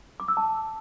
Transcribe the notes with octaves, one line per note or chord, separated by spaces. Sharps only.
D6
E6
A5